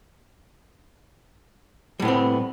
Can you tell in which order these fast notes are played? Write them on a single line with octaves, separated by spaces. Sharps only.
G3 A2 B3 C4